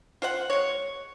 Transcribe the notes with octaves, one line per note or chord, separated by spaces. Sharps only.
F4 C5 F#5
G#3 C#5